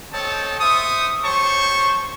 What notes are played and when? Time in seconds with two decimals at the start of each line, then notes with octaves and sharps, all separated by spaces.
0.13 C4 A4 C#5 D#5 G5 A5
0.60 C5 E5 C#6 D#6
1.23 G4 C5 C#5 A5 C#6